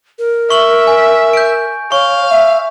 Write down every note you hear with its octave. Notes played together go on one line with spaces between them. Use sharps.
A#4
E5 C#6 F#7
G#5
G6 D7
C#5 F5 C#6
E5